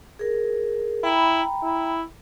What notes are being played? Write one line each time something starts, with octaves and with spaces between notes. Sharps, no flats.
G#4 A#4
E4 G5 A#5 B5
E4